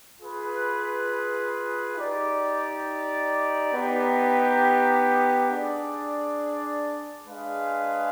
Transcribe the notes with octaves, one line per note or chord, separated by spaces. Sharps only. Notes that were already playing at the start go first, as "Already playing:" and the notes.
F4 G#4 B4
D#4 G4 D5
B3 D#4 G4
D4 G#4 D5
G#3 D4 G#4 B4 F5